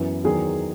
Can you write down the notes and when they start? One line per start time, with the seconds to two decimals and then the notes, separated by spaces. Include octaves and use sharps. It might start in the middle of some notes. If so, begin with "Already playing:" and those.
Already playing: F#2 E3 B3
0.24 E2 D#3 F#3 G#4